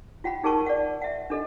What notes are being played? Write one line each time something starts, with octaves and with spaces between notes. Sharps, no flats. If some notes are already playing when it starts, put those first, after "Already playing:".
F4 F#5 G5 B5
D#4 G#4 A#4 A5 C#6
D5 F#5
E5 F#5
D4 A4 D#5